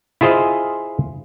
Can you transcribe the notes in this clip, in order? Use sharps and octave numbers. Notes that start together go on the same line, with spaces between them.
E4 F4 G#4 C5 D#5 F5